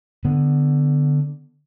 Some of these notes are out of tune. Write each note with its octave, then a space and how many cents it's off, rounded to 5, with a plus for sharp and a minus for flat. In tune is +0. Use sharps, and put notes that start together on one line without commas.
D3 +0 B3 +0